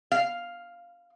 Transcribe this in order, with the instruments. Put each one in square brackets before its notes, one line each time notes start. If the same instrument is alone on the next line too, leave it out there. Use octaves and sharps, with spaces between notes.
[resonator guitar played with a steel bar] F5